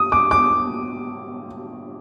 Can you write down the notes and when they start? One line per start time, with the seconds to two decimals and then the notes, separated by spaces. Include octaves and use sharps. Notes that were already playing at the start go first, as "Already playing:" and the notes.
Already playing: D#6
0.12 D6
0.31 D6